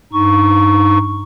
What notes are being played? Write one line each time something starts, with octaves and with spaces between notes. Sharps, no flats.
G2 D#4 C#6